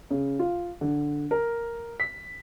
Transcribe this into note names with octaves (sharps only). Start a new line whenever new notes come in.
C#3
F4
D3
A#4
B6